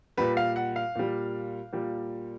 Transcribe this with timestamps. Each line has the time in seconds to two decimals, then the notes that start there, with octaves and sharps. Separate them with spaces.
0.17 A#2 G3 B4
0.37 F5
0.56 F#5
0.76 F5
0.95 A#2 G3
1.73 A#2 G3